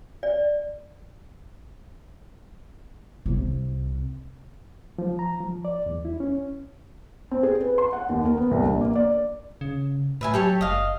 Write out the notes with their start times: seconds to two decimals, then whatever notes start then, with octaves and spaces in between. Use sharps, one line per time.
0.23 D5
3.26 C2 C3
4.99 F3
5.19 A#5
5.40 F3
5.65 D5
5.86 E2
6.05 E4
6.20 C#4
7.31 C4
7.43 G#4
7.61 B4
7.78 C6
7.93 F#5
8.09 D#2
8.25 A#4
8.37 B3
8.51 C2
8.63 A#1
8.81 A#3
8.96 D5
9.61 C#3
10.21 A2 B4 E5 G#5
10.34 F#3 G4 A4 C#5
10.61 F#1 D#5 F5